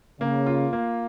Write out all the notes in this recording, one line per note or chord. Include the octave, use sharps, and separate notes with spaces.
C#3 A#3
F4
A#3